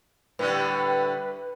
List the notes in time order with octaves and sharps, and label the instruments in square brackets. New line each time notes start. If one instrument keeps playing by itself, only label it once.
[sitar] A2 D3 G3 [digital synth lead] B4